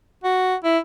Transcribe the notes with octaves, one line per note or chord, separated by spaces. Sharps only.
F#4
E4